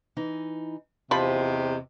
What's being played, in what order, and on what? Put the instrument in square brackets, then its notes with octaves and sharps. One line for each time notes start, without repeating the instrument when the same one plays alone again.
[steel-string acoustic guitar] E3 D#4
[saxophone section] E2 C3 [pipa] F3 B5 [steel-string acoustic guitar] G4 D#5